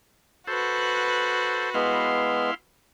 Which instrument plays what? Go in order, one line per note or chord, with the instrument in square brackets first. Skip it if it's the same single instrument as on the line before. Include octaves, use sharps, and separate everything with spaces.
[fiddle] F#4 B4 [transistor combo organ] A4 C5
[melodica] G#3 B3 [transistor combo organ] E4 F5 C6